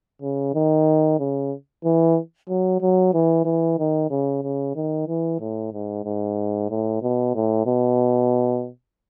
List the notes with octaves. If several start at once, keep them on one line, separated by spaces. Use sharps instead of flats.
C#3
D#3
C#3
E3
F#3
F#3
E3
E3
D#3
C#3
C#3
D#3
E3
A2
G#2
G#2
A2
B2
A2
B2